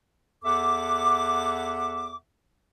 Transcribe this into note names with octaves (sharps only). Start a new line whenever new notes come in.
E2 A4 E5 F#5 D6